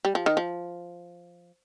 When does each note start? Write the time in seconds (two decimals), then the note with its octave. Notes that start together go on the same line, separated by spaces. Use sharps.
0.05 G3
0.15 F3
0.26 D#3
0.37 F3